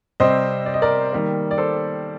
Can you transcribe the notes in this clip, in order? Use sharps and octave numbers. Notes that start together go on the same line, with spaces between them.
C3 G3 C4 C5 D#5
D5
D#5
A#4 D5
D#3 G3 A#3
D5
A4 C5